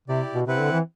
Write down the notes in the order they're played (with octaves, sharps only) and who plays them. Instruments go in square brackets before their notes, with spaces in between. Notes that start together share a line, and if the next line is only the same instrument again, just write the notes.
[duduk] C3 [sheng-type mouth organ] E4 G4 D5
[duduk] B2
[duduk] C3 [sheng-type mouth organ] C4 E4 B4 F#5
[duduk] D3
E3